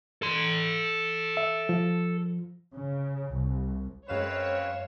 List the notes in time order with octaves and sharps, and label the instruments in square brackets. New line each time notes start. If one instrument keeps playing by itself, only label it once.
[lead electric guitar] A4 C6
[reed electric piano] E5
F3
[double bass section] C#3
C2
[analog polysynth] F#2 F5 E7 [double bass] G#3 [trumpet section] C4 C#4 B4 [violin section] C#5